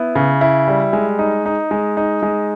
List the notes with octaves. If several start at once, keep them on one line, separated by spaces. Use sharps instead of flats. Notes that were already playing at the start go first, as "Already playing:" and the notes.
Already playing: B3 E4
C#3
E4
G3
G#3
D#4
D#4
G#3
D#4
G#3